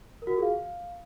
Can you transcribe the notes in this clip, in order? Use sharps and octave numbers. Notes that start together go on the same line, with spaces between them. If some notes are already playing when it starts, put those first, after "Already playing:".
A#4
F#4
F4
G#4
F5